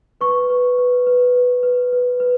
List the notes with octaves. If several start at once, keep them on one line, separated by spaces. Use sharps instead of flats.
B4 C#6
B4
B4
B4
B4
B4
B4
B4